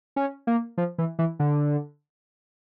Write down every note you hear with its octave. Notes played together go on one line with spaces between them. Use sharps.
C#4
A#3
F3
E3
E3
D3